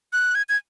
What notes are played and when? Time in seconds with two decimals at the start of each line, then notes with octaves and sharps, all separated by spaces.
0.13 F#6
0.35 G#6
0.49 G#6